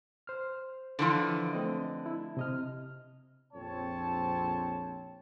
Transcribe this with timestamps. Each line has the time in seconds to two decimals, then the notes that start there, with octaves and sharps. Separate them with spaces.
0.27 C5 F6
0.99 D3 E3 F3
1.53 A3 C4 D#5
2.06 E4
2.37 C3 D#5 F6
3.54 A#1 F2 C4 C#5 A5